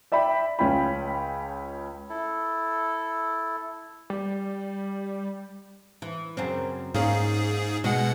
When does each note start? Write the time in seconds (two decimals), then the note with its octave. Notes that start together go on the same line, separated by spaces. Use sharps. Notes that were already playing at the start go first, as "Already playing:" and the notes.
0.12 D5 E5 G5 B5
0.59 C#2 C#4 F4 G5 B5
2.09 E4 A4
4.10 G3
6.02 E3
6.37 F#2 C#3 C4
6.94 G#2 A#3 C#4 G#4
7.84 B2 G#3 G#4 F#5